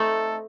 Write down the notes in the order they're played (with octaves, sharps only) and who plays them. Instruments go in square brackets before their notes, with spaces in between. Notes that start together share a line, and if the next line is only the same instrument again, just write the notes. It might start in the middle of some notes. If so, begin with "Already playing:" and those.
Already playing: [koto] A3 C4 D#4 [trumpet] A4